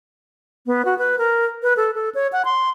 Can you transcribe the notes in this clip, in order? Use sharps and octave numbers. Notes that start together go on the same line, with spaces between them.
B3
F#4
B4
A#4
B4
A4
A4
C#5
F#5
C6